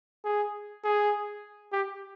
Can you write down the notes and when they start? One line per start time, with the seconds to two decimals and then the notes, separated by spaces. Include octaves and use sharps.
0.25 G#4
0.84 G#4
1.72 G4